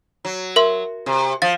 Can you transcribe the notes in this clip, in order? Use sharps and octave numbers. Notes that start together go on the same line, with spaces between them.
F#3
A#4 E5 C6
C3
F3 F5 A6